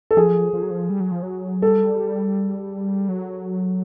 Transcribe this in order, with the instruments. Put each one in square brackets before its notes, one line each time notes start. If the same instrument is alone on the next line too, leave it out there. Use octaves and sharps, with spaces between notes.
[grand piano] A4
[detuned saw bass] F3 [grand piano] G#4
[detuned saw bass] F3
F#3
F3
G3
F#3
F3
F#3
[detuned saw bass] G3 [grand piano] A4
[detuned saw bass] F#3